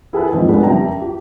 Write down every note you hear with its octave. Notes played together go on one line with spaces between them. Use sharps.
E4 G#4 A4 B4
D#2 G#2 D#3 F3 C4
G#3 B3 D4 G#4 A4 B4
F#1 F2 G3 G5 A5 A#5
G4